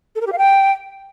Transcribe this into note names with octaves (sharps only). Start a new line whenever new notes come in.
A4
A#4
G4
F5
G5